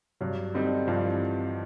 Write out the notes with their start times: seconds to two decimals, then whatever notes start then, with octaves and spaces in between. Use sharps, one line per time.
0.21 G2 F#3
0.54 D3 G3 C4 D#4
0.87 G2 F3
1.04 E3